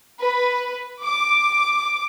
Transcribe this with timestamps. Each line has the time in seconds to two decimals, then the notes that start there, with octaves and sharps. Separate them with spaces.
0.20 B4
1.02 D6